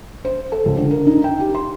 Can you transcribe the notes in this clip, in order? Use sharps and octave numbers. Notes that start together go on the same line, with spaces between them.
C5
A4
C#2
D3
A#4
D#4
G5
G4
C6